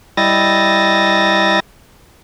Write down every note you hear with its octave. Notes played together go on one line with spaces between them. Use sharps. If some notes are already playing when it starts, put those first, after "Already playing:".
G3 E4 D#5 A6 A#6